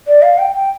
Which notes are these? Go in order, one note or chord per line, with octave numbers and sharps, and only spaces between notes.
D5
F5
G5
G5